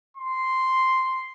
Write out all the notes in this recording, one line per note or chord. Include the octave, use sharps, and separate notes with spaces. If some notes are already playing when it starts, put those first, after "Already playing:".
C6